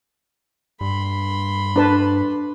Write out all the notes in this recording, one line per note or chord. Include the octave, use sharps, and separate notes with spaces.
G2 B5 C6
D4 B4 A5